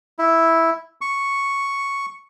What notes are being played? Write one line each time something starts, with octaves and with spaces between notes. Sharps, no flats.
E4
C#6